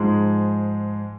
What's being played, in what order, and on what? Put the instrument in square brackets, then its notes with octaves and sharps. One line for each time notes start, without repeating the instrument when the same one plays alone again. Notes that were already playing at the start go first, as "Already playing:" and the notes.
Already playing: [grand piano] G#2 F3 G#3